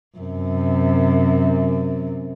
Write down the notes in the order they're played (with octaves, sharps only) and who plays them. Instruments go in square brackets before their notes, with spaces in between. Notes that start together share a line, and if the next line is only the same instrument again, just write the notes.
[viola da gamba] F#2 C3